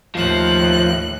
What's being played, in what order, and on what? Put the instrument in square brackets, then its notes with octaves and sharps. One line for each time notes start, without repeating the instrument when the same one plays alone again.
[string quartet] D#2 A2 F#6 [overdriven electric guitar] F3 C5